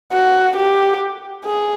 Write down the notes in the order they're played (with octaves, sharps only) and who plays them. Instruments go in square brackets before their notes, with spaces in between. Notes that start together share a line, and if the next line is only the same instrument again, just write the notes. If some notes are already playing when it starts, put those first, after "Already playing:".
[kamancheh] F#4
G4
G#4